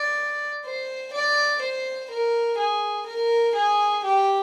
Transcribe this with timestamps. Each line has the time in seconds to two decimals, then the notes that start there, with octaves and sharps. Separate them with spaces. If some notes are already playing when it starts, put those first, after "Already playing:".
Already playing: D5
0.65 C5
1.14 D5
1.62 C5
2.10 A#4
2.58 G#4
3.06 A#4
3.54 G#4
4.04 G4